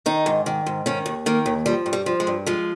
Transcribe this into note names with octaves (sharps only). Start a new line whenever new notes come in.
D#3 D#4
G#2
D#3
G#2
D#3 C#4
D#2
D#3 A#3
D#2
F3 G3
G2
G3
F3
G#3
G2
F3 G#3